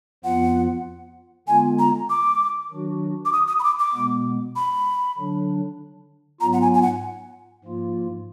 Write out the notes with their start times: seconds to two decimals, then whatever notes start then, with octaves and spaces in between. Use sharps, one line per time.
0.24 F2 F3 B3 F4 F#5
1.48 D3 G#3 B3 F4 G#5
1.79 A#5
2.10 D6
2.71 D#3 F#3 D4 F#4
3.25 D6
3.32 D#6
3.48 D#6
3.59 B5
3.64 D6
3.79 D6
3.94 B2 G#3 B3
4.56 B5
5.18 D3 F#3 D4
6.41 G#2 F#3 B3 F4 A#5
6.53 F#5
6.62 G#5
6.74 G#5
6.82 F#5
7.64 G#2 F3 A#3 F4